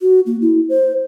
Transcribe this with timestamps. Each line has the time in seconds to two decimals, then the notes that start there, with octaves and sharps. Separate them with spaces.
0.01 F#4
0.26 A#3
0.41 E4
0.69 C5